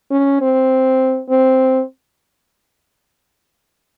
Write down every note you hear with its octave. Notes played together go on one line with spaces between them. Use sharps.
C#4
C4
C4